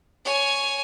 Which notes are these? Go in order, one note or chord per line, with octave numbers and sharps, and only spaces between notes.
C#5 G#5